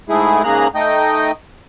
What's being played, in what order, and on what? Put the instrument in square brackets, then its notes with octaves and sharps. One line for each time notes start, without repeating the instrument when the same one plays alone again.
[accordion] G#2 G#3 A3 E4 G#4
G#2 C#3 A#3 G#4 A#5 F#6
A3 D#4 D#5 G5